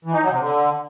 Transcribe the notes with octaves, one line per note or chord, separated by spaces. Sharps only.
E3
D#4
F#3
C3
D3